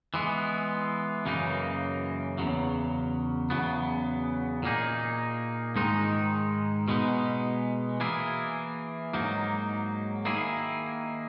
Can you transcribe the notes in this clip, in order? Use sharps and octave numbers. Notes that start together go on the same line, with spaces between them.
E3 G#3 B3
F#2 C#3 E3 A#3 D#4
E2 C#3 F#3
E2 C#3 F#3 B3
A#2 A#3 D#4 G#4
G#2 D#3 G#3 D#4
B2 G#3 B3 D#4
E3 A#3 E4 G#4
G#2 F#3 A#3 D#4
D#3 A#3 E4 G#4